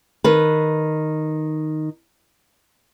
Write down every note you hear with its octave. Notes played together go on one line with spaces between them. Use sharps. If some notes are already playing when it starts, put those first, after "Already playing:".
D#3 B4